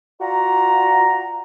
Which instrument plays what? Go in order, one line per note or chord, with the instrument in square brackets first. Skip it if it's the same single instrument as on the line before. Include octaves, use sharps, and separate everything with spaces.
[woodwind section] F4 F#4 D5 A#5